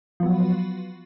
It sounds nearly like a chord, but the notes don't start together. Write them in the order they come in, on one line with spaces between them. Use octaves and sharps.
F3 B3 F#3